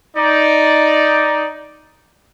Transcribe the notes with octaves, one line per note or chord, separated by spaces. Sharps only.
D#4 D5